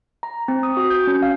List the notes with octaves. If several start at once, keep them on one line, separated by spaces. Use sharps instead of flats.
A#5
C4
D#6
F#4
G6
C#4
F5